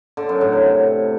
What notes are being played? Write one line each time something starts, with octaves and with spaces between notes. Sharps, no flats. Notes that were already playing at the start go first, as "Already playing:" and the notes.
D3
F#2
A2
C3